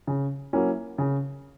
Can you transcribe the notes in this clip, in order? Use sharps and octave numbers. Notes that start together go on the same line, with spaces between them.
C#3
F#3 A#3 C#4 E4
C#3